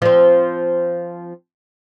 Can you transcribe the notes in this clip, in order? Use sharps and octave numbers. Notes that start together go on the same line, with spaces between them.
F3 C4